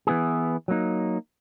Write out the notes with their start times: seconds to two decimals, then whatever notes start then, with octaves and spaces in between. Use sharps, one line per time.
0.07 E3 B3 E4 G#4
0.68 F#3 A#3 D#4